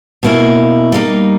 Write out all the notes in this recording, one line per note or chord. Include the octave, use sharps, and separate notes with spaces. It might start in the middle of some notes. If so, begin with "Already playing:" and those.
B2 A#3 C#4 E4
G3 A#3 D#4